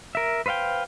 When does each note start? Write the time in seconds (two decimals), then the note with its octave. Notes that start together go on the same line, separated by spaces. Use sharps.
0.15 A#4 E5
0.46 B4 C5 E5 F5 G5